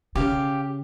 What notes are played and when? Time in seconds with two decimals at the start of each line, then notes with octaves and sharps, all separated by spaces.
0.15 C#3 G4 F5